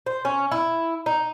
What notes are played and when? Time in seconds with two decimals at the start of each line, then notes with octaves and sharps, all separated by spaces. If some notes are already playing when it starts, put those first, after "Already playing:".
0.06 C5
0.25 C#4
0.52 E4
1.06 D#4